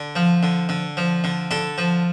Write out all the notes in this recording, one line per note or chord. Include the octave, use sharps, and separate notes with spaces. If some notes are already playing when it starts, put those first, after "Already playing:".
Already playing: D3
F3
D3
D3
F3
D3
D3 A4
F3